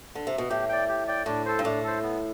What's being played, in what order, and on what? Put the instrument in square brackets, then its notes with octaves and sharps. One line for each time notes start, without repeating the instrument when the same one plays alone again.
[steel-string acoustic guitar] D3
C3
B2
[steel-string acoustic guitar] A2 [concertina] G4
[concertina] D5 G5
G4
D5 G5
[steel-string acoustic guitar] A2 [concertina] D4
[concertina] A4 C5
[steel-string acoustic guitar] G2
[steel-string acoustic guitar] A2 [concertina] D4
[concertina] A4 C5
B3